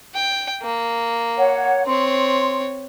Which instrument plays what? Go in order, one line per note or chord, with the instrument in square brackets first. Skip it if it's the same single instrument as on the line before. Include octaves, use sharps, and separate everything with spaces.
[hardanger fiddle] G5
A#3
[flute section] C#5 F#5
[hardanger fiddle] C4 C#5 [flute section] C6